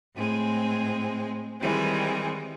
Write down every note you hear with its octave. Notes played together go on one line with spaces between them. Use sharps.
A2 G#3 C4
D#3 E3 G3 G#3 C4